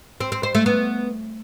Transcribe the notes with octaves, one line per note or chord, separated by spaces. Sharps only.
C4
C4
C5
A3
B3